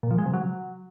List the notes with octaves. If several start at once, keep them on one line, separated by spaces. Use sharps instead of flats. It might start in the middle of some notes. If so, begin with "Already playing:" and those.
A#2
F3
G#3
C3
F#3